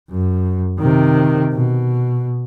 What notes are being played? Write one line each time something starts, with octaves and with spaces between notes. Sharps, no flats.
F#2
C3 D#3
B2